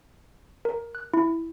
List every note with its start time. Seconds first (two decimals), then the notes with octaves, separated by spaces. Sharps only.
0.65 A#4
0.95 F#6
1.13 E4